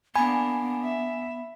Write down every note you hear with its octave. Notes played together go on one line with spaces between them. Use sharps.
A#3 B3 D4 G#5 B5
E5